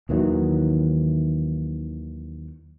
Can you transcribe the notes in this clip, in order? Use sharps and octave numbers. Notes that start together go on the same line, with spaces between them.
D#2 D#3 E3 F#3